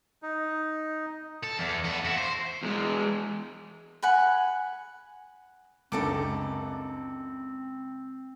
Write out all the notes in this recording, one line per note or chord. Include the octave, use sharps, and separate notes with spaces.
D#4
A4
E2
B3 A4
E4 F#4
C5
E2 G#3
F#5 G#5 B5
C#2 F#2 D3 C4 D#4 A4 D6